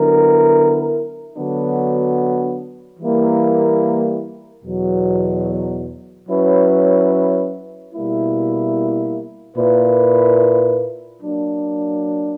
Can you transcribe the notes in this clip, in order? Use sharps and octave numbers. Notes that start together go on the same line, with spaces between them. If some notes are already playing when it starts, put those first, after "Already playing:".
Already playing: D3 F#3 B3 E4 A#4
D3 F#3 B3 D4 F#4
E3 G3 A#3 E4
E2 B2 F#3
F#3 C#4 E4 B4
B2 G3 A#3 E4
A#2 A#3 E4 B4
F#3 A#3 D4